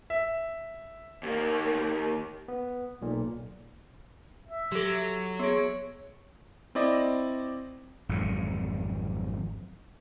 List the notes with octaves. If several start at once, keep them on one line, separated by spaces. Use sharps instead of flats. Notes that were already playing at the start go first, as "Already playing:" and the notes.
E5
D#2 A#3
B3
B1 A#2
E5
F#3 G4 A4
B3 G#4 C#5
C4 E4 D5 D#5
G#1 F2 D3 F#3